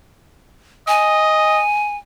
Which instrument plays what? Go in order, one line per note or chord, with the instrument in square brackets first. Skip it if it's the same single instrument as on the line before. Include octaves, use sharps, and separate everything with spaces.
[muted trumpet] D#5 [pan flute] G#5